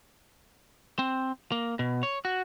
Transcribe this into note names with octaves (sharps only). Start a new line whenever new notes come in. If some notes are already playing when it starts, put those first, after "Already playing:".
C4
A#3
B2
C#5
F#4